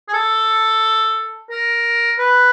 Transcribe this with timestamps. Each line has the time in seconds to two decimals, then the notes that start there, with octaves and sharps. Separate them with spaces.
0.09 G#4
0.13 A4
1.51 A#4
2.19 B4